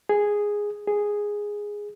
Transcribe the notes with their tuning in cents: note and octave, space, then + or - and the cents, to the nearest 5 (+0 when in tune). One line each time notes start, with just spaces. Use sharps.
G#4 -5
G#4 -5